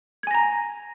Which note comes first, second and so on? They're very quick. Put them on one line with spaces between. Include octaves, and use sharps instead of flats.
G#6 G#5 A#6 A#5